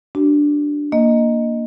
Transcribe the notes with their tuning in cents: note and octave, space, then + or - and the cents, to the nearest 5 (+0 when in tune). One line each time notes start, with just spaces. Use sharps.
D4 +0 G4 -45
A#3 +0 D#5 +0